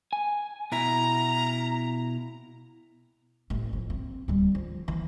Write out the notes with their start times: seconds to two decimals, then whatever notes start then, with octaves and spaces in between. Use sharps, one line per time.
0.13 G#5
0.72 B2 E4 A#5
3.50 A1 A3
3.73 F3
3.90 C4
4.28 D1 G3
4.55 F3
4.88 E3